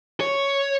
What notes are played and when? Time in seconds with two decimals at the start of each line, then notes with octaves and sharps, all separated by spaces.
0.21 C#5